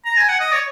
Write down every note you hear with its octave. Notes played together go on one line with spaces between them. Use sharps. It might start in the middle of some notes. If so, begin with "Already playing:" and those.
A#5
G#5
F#5
D#5
C#5